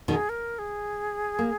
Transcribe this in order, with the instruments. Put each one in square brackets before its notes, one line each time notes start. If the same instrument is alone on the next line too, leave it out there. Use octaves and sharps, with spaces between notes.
[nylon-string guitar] B2 D#3 [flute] G#4
[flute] A#4
G#4
[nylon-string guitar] A#3